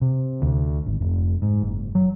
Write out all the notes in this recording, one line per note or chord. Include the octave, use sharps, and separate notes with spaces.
C3
D2
G#1
F1
G#2
F#1
F#3